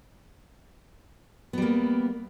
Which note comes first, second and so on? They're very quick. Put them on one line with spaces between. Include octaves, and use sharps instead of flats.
B3 G3 A#3